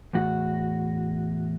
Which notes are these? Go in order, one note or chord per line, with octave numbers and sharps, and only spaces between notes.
E2 A2 F#4